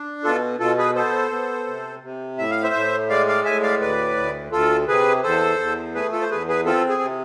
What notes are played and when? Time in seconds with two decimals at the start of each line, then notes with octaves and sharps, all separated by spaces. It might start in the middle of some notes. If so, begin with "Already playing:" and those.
Already playing: D4
0.24 B2 F4 A4
0.60 B2 F4 A4
0.78 G#4 B4
0.95 B3 A4 C5
1.31 B3
1.67 C3
2.03 C3
2.38 A2 E5
2.51 F5
2.63 C5 E5
2.74 A2
3.10 G#3 D5 F5
3.28 D5 F5
3.45 A2 E5 G#5
3.63 D5 F5
3.80 D2 B4 D5
4.17 D2
4.52 D2 F4 A4
4.88 C3 G#4 B4
5.23 E2 A4 C5
5.59 E2
5.95 A3 G#4 B4
6.12 F4 A4
6.22 C5
6.30 E2 G#4 B4
6.48 G#4 B4
6.66 C4 F4 A4
6.89 G#4
7.02 C3